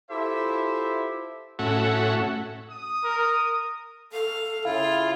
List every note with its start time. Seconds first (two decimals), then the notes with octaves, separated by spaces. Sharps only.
0.11 E4 F4 G4 A4 C5 E5
1.59 A2 C#4 F#4 A4 E5 F#5
2.70 D#6
3.04 A#4
4.12 A4 F5
4.65 C#3 E4 F4 F5